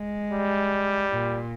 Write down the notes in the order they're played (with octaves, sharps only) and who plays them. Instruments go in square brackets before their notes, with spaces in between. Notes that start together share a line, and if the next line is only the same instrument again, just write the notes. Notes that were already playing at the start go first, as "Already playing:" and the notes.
Already playing: [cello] G#3
[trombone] G3
[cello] A#2